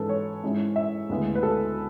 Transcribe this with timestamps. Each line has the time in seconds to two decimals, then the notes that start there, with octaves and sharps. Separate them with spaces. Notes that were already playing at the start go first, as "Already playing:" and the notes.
Already playing: G#2 E3 G#3 C#4 E4 A4 B4
0.09 C#5
0.44 G#2 G#3 C#4 E4
0.76 E5
1.09 D2 C#3 G#3 B3 E4
1.35 B4
1.43 A4